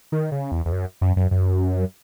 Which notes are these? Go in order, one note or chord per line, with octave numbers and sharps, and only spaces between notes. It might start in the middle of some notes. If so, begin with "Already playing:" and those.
D#3
C#3
E2
E2
F#2
F#2
F#2
F#2